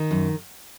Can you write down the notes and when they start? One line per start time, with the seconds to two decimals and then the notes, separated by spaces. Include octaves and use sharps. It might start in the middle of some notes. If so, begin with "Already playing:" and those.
Already playing: D#3
0.11 F#2